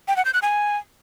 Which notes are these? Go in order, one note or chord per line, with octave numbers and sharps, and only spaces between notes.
G5
F#5
G6
F#6
G#5